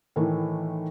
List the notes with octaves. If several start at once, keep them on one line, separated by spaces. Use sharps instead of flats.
A2 D#3 E3 A3